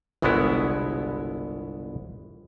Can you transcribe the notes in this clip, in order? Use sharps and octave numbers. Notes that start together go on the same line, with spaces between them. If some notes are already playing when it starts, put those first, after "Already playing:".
G1 C2 B2 G#3 B3 E4